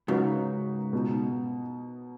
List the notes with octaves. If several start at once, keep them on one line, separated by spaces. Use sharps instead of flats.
G#2 C#3 F#3 D#4 F#4 B4
B2 B3 D#4